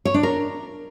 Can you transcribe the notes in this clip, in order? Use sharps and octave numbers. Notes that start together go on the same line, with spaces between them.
C#5
D4
A#4